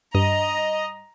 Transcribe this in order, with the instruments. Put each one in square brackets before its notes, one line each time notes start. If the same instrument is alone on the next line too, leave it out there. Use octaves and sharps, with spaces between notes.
[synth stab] G2 [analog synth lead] D#5 [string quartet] A#5